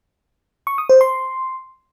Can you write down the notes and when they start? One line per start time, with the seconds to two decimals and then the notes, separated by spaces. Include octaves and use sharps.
0.67 C#6
0.78 D#6
0.89 C5
1.01 C6